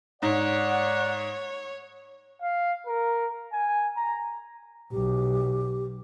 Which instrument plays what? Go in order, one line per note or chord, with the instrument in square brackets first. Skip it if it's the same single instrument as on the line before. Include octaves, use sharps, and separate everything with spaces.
[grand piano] G#2 [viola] C#5 [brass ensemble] D5 F#5
[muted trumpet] F5
A#4
G#5
A#5
[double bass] B1 [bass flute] G4